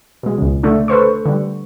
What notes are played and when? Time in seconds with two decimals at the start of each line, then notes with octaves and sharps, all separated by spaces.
0.23 B2 G#3
0.38 C#2 C#3
0.63 D3 A3 D4
0.88 A4 B4 C5 C#6
1.26 D3 G3